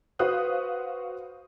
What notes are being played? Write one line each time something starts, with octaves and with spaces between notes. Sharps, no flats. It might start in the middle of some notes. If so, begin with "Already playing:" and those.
F#4 B4 C5 F5 D#6 F#6